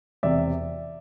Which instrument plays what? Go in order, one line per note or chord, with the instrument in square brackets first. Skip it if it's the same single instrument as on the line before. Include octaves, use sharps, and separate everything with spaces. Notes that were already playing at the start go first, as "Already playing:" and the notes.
[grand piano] E1 E2 C3 D5 E5